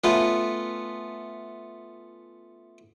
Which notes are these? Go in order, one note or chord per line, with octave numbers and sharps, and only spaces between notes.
A3 B3 C#4 F4 B4